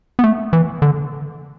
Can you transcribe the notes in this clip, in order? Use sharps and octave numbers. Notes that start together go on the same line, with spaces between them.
B3
A3
E3
D3